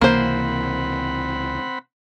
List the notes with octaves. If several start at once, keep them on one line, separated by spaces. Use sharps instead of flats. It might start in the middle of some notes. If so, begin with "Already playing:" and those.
C#2 C3 E3 A#3 C4 C5 F#5 B5